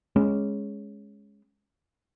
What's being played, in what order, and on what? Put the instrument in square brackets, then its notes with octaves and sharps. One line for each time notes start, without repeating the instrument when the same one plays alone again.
[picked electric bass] G#3 C#4